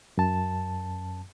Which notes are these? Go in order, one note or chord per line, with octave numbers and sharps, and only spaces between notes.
F#2 A5